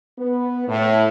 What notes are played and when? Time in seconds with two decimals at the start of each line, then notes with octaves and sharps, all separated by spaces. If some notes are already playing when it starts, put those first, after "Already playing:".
0.19 B3
0.68 A2